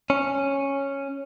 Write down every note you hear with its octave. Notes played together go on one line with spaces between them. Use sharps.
C#4